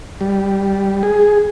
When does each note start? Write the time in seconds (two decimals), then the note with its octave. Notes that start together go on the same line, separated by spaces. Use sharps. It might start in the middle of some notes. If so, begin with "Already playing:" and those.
0.21 G3
1.03 G#4